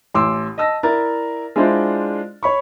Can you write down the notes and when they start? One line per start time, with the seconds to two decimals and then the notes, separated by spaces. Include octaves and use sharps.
0.14 A1 C6 D6 E6
0.58 D#5 A5 E6 A#6
0.83 E4 A#4 D5 E5 A6
1.56 G#3 D4 E4 F4 C5 D5
2.43 C#5 B5 C#6